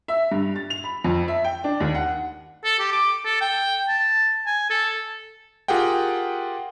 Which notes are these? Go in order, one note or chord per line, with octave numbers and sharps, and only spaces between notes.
E5
G2
A6
F7
B5
F2
E5
G5
D4
D#2
F#5
A4
G4
D6
A4
G5
A5
G#5
A4
F4 G4 G#4 A#4 F#5 G5